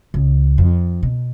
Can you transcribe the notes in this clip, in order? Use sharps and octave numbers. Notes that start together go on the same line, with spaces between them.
C#2
F2
B2